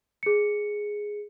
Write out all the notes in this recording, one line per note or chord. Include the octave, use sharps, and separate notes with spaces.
G#4 C#7